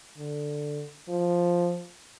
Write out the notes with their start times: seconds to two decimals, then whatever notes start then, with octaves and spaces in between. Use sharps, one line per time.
0.18 D3
1.09 F3